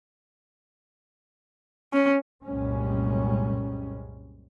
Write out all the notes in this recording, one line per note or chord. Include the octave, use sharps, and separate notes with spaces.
C#4
C2 F#2 A#2 G3 G#3 C#4